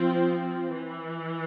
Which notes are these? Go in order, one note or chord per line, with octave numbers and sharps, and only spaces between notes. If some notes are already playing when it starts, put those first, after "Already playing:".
Already playing: F3 C4
E3